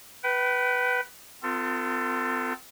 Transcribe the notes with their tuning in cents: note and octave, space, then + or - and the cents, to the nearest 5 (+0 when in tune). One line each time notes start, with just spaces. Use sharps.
B4 +0 G5 -40
C4 -40 F4 +0 A4 +30